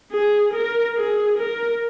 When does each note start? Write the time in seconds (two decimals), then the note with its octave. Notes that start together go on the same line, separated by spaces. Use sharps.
0.12 G#4
0.54 A#4
0.96 G#4
1.38 A#4